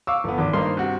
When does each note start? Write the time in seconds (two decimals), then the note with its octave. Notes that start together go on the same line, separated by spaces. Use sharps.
0.07 F5 C#6 D6 E6
0.24 G1 B3
0.38 G#1 D6
0.53 G2 D#3 A#3 C5 C6
0.77 C3 F#4